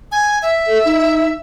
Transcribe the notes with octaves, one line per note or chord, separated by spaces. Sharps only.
G#5
E5
A4
D#4